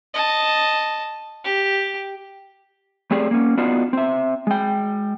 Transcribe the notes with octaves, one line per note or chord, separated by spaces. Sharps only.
D#5 A5
G4
A3 C4 G4 G#4 D5
A#3 C#4
B3 D4 D#4 F4 F#4
C4 E5
G#3 G5